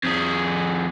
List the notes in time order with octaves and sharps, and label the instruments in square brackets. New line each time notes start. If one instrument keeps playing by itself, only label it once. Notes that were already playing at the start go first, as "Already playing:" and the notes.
[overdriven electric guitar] F2 G#4